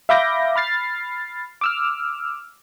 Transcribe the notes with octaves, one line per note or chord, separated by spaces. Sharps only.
E5 F5 B5 D6 G6 A#6
B5 F6 A6 C7
D6 E6 F6